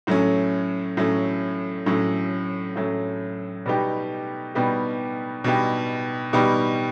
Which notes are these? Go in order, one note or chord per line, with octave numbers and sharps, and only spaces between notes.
A2 F#3 A3 C#4
A2 F#3 A3 C#4
A2 F#3 A3 C#4
A2 F#3 A3 C#4
B2 G3 B3 D#4 G4
B2 G3 B3 D#4 G4
B2 G3 B3 D#4 G4
B2 G3 B3 D#4 G4